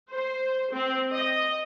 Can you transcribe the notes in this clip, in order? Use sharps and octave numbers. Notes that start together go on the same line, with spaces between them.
C5
C4
D#5